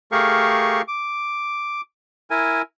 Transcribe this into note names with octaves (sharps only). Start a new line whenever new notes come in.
A3 G4 G#4 A#4 F5 C#6
D6
E4 A#4 G#5